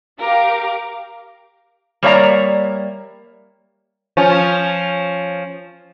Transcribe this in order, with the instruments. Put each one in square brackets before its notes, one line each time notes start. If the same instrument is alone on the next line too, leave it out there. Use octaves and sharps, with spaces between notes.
[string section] G4 A#4 F5 D6
[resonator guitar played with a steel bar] G3 A#3 C#5 D5 E5 A#5
[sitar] F3 C#4